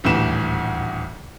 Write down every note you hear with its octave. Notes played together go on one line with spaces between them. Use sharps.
D#1 D2 A2 E3 E7